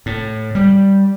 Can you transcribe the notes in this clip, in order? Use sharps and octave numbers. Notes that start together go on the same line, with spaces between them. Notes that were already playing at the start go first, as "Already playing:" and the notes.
A2
G3